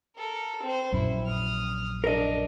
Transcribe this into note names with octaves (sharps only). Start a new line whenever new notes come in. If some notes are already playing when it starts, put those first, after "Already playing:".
A4 A#4
C4 C5
A#1 F#2 C#4 E4
D#6 F6
D4 A#4 D#5